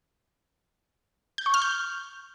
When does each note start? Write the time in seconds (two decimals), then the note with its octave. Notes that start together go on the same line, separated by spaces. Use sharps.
1.38 G6
1.46 C#6
1.54 F6
1.62 G6